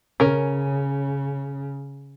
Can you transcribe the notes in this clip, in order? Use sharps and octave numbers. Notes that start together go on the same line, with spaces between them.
C#3 C#4 A#4